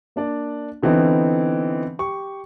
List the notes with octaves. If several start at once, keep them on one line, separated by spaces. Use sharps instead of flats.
A#3 D4 D5
D3 E3 B3 C4 D#4
G4 C#6